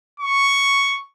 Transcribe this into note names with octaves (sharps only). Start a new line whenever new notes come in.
C#6